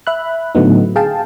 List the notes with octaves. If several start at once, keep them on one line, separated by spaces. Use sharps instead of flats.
E5 B5 F#6
A2 D3 F#3 A3 B3 D#4
G#4 F5 G5 A5